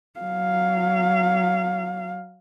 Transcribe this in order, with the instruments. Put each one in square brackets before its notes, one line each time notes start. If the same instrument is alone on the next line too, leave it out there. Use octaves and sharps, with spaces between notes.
[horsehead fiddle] F#3 F5